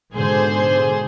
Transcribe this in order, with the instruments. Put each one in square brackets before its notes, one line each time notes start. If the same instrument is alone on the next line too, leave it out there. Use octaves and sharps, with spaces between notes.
[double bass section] G#2 B2 D3 [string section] G#4 C5